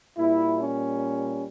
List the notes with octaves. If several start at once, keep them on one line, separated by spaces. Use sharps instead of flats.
A#2 G3 E4
C#4